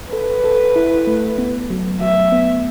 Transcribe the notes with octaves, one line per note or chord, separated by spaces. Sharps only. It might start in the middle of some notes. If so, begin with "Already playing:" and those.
A4 B4
A4
E4
A3
B3
F#3
F#3 E5
B3